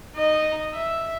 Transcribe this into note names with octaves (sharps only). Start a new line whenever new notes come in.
D#4 D#5
E5